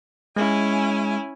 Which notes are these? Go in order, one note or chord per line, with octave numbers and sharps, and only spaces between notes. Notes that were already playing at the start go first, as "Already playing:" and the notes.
G#3 C#4 E4 G#5